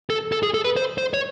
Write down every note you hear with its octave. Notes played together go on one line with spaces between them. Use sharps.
A4
A4
G#4
A4
B4
C5
C5
C#5